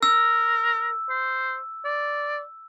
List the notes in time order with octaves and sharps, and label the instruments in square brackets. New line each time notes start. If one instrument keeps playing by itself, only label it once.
[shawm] A#4 [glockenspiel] E6
[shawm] C5
D5